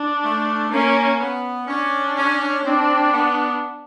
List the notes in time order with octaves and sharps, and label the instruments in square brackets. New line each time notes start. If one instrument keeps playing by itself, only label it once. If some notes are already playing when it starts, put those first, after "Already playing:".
Already playing: [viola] D4
[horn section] A3
[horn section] A#3 [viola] C#4
[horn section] B3
[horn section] C#4 [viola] D4
[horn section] C#4
[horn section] C4 [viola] D4
[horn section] B3